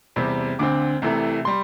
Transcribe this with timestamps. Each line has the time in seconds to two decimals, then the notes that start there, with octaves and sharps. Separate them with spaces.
0.16 E2 C3 G3 C4
0.59 D2 D3 C4 D6
1.02 C2 C3 E3 A3
1.45 G3 C6